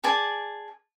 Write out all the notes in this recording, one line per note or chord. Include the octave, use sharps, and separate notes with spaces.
G#4 D5 G#5 A5